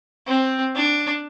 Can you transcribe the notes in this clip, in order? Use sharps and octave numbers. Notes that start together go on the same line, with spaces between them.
C4
D4